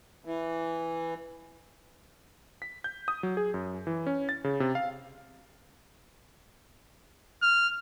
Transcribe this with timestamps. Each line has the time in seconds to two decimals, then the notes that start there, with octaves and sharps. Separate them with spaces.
0.25 E3
2.62 B6
2.84 G6
3.08 D#6
3.23 F#3
3.37 G#4
3.54 F#2
3.87 E3
4.07 C#4
4.29 A6
4.44 C#3
4.60 C3
4.75 F5
7.42 F6